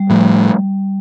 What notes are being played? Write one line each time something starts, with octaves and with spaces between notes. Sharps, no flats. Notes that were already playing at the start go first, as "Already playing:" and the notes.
Already playing: G3
A2 F3 A3